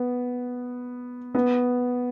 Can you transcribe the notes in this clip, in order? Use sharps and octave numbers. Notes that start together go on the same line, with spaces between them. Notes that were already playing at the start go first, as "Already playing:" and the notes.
Already playing: B3
B3